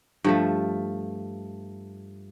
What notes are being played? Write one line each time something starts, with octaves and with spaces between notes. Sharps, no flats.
G2 F3 A3